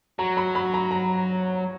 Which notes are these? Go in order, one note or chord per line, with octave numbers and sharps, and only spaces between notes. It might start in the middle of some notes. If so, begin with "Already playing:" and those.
F#3 A#5
B5
B5
A#5
A#5